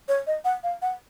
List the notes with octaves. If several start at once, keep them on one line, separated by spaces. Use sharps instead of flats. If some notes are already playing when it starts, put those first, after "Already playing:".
C#5
D#5
F#5
F5
F#5